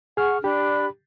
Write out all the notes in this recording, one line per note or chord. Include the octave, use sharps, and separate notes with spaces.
G#4 F#5 C#6 F6
D4 G4 D5 B5